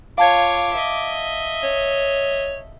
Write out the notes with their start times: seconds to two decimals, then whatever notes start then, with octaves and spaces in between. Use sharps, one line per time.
0.18 F4 C#5 F5 A5 D6 G#6
0.73 D#5 E5
1.63 C#5